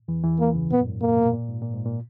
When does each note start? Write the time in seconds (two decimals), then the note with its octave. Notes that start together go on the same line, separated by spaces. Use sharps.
0.08 E2 E3
0.24 E2 E3
0.40 A#3
0.55 C#2 C#3
0.71 A#2 B3
0.81 F#2
0.87 G#2
1.02 A#2 A#3
1.17 B2
1.33 A#2
1.49 G#2
1.62 A#2
1.74 G#2
1.86 A#2